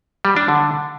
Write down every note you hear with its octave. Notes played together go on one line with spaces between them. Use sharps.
G3
D4
D3